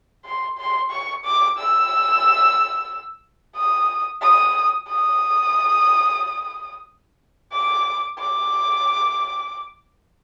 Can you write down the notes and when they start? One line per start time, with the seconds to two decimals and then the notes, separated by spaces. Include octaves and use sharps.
0.25 C6
0.58 C6
0.91 C#6
1.25 D6
1.58 E6
3.56 D#6
4.22 D#6
4.89 D#6
7.53 D6
8.19 D6